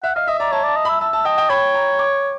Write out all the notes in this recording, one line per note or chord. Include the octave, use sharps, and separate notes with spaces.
E5 F#5
D#5 F5
D#5 E5
D5 A#5
C#5 A5
D5 A5
D#5
B5
E5
E5 A5
A5
D#5 G5
G5
C#5 B5
A#5
D6